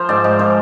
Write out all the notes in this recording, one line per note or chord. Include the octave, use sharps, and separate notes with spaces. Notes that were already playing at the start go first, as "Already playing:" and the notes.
Already playing: F3 C5
G#2 D5
G#2
F3 C5